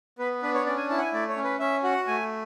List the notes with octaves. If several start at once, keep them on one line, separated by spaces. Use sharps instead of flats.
B3 B4
D4 B4
C#5
C#4 D5
G#5
E4 A5
F#5
G#5
A3 D5
C#5
C#4
B4
C#4 E5
F#4 F#5
A3 G#5